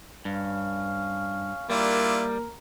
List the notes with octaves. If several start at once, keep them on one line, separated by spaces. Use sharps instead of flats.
G2 C#4 F5
G3 A#3 D4 E4 F4 A#4